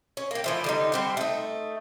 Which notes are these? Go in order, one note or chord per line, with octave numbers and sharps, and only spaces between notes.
C#4
A#3 G4
E3 F3 A3
D3 G3 D#4
G3 C4 F#5
A3 D#4